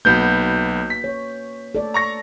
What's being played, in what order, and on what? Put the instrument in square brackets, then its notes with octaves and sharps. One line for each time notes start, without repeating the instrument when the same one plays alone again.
[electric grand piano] B1 B3 G6 [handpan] A#3 F#4 B4
[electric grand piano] B6
[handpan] C#5
A4 D5
[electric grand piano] A#5 C#6 A#6